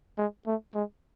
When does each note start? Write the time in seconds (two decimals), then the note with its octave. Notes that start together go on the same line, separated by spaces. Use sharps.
0.17 G#3
0.46 A3
0.75 G#3